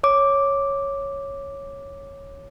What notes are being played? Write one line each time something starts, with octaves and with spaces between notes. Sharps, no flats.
C#5 D6